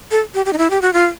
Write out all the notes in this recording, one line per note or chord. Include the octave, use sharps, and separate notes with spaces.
A4
G4
G4
D#4
E4
G4
F#4
F4